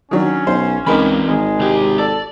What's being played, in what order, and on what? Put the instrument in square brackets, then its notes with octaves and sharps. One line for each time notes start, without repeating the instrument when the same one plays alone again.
[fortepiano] D#3 F#3 D4 [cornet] C#4
[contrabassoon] B1 [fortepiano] C5
[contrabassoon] C#2 [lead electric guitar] E3 C4 [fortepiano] D#4 A#4 B5
[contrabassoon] G#1 [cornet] G#3
[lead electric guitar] C2 G4
[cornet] A4 [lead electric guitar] D5